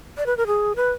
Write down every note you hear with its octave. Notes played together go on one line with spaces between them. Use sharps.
D5
B4
A#4
G#4
B4